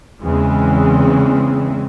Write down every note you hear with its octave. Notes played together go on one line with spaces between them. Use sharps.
E2 C#3 E3 G#3 C4